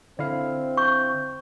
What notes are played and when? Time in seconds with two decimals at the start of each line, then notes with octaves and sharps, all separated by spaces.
0.19 D3 C4 E4 D5 F5
0.77 C#6 G6